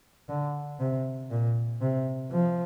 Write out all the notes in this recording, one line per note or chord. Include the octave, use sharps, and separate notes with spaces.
D3
C3
A#2
C3
F3